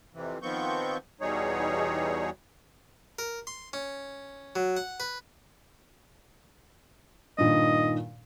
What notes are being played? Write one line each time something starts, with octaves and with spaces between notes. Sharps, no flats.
F2 C3 E3
D#3 F3 B3 C4 C#6 G6
E2 B2 G3 D#4 G#4 C#5
A#4
C6
C#4
F#3
F#5
B4
G2 A#2 D#3 D#5